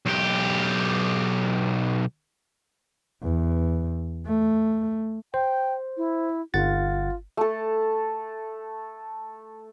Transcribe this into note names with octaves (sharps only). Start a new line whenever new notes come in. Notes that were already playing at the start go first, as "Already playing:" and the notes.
B1 G4
E2
A3
C5 G5
E4
G1 F4 F#5 A6
A3 A4